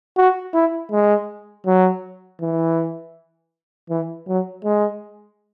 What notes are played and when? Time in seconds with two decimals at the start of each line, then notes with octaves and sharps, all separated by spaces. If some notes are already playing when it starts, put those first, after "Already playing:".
0.17 F#4
0.54 E4
0.92 G#3
1.66 F#3
2.41 E3
3.90 E3
4.28 F#3
4.64 G#3